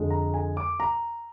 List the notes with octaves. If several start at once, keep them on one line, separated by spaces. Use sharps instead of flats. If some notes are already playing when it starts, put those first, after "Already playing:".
Already playing: F2 D3 G#3
A#5
G#5
D6
A#5